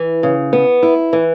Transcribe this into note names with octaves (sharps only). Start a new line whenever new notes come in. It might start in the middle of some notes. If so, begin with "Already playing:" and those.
Already playing: E3
C#3
B3
E4
E3